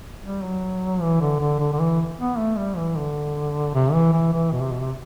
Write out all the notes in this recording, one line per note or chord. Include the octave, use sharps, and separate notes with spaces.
G3
F#3
E3
D3
D3
D3
D3
E3
B3
A3
G3
E3
D3
C3
E3
E3
E3
B2
C3
B2
C3